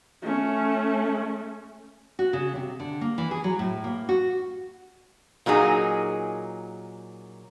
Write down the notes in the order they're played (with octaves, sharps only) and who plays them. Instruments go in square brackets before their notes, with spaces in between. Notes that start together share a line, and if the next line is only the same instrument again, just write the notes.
[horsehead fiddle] A3 C#4
[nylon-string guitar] F#4
C#3
C3
D3
A#3
E3
G#4
F#3
A2
A#3
F#4
[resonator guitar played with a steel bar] A#2 F#3 D#4 G#4